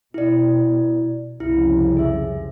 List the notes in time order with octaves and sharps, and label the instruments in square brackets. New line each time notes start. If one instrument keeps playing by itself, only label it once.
[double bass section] B2 [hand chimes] E4 D5
[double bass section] C2 F2 C#3 [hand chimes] E4
[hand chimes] G#4 E5